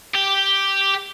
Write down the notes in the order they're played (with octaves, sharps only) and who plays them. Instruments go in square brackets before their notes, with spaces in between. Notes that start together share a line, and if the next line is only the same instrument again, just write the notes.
[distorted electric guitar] G4